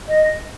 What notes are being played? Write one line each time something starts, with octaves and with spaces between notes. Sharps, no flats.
D#5